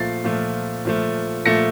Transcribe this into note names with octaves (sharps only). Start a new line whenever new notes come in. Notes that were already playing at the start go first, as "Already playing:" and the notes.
Already playing: A#2 F3 A3 A6 C7
A#2 F3 A3
A#2 F3 A3
A#2 F3 A3 A#6 C#7